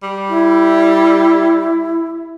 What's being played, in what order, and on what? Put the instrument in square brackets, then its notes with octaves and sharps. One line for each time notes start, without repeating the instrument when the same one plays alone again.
[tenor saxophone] G3
[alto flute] E4